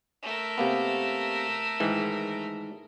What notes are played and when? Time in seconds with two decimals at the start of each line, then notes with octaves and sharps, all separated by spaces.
0.23 A3 A#4
0.58 C3 A#3 B3
1.80 G#2 D#3 E3